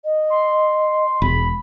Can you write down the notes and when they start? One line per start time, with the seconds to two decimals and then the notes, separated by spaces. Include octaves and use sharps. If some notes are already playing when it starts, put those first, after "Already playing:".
0.04 D#5
0.30 C6
1.22 E1 B5